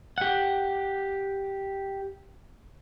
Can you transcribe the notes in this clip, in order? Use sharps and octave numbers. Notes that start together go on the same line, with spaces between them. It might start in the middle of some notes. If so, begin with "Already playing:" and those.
G4 F#5